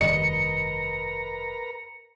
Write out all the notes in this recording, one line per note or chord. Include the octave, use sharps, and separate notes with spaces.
F1 G2 D#3 A#4 B4 D#5 A#5 C#7